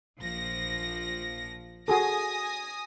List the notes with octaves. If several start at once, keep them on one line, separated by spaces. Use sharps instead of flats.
A#1 F3 A#6
F#4 G#4 A4 G#5 D#6 A#6